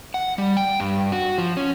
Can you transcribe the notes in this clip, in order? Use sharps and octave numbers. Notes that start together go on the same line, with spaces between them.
F#5
G3
G5
G2
F#4
F3
C#4